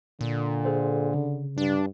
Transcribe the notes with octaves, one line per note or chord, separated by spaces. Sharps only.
A#2 D3
G#4 A4 C5
C#3
G2 D4